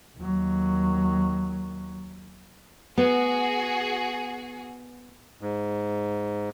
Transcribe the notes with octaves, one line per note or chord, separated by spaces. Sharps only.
D#2 F#3
B3 F#4 G#4
G#2